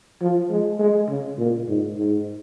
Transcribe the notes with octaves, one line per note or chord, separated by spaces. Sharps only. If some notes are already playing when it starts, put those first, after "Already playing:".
F3
G#3
G#3
C#3
A#2
G#2
G#2